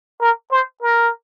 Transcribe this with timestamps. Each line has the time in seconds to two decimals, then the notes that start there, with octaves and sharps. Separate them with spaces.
0.21 A#4
0.52 C5
0.82 A#4